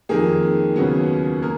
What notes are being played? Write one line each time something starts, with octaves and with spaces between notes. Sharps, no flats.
F2 D#3 A#3 G#4
D#2 C#3 F#3 B3
A#3 A#4